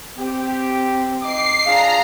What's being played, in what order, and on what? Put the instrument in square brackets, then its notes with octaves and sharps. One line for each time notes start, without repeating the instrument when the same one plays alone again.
[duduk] C4 [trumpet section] G4
[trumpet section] D#4 D#5 D6 [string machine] C7
[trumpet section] D4 F4 [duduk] G#4 [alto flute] F5 [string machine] A#5